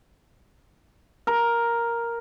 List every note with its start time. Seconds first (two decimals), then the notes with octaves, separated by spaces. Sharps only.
1.27 A#4